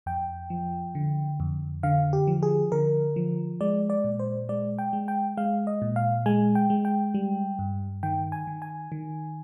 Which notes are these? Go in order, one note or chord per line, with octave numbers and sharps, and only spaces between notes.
F2 G5
F3
D3
F2
D3 F5
G4
F3
G#4
D3 A#4
F3
G#3 D5
D5
A#2
C5
G#3 D5
G5
G#3
G5
G#3 F5
D#5
A#2
F5
G#3 G#5
G5
G#3
G5
G3
G2
D#3 G5
G#5
D#3
G#5
D#3